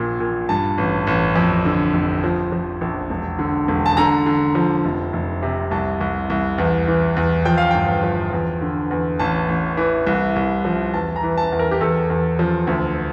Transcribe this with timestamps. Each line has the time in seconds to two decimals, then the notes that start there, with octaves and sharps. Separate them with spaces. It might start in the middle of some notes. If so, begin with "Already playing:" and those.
Already playing: A#1 A#2
0.20 A#2
0.49 G2 A5
0.78 A1
1.07 A1
1.35 F2
1.65 D3
1.93 F1
2.24 F3
2.52 F3
2.81 A#1
3.10 E1
3.39 D3
3.68 E1
3.86 A5
3.97 D3 A#5
4.26 D3
4.55 F3
4.85 F1
5.13 F1
5.42 C3
5.71 C2 A5
6.01 C2
6.30 C2
6.58 E2
6.88 E3
7.16 E2
7.45 F3 G5
7.58 F5
7.71 G1 G5
8.03 F3
8.33 E2
8.61 D3
8.91 E2
9.19 A1 A5
9.48 A1
9.77 E3
10.07 C2
10.36 C2
10.65 F3
10.94 E2 A5
11.16 A#5
11.23 E3
11.37 A5
11.52 E2
11.59 A#4
11.71 G4
11.81 E2 A4
12.10 E2
12.39 F3
12.67 D2